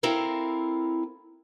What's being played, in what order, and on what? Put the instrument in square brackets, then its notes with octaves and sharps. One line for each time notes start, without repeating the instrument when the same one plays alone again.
[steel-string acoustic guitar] C4 E4 A4 A#4 F5